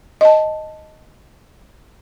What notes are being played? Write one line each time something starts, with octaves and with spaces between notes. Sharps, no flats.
D#5 A5